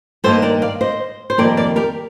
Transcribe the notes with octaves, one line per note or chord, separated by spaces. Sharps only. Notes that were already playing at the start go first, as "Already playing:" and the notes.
G2 D#3 A#3 A4 C5
A#4 D5
D5 F5
C5 D#5
C5
F2 D#3 G3 A#3 A#4 D5
A#4 D5
G4 A#4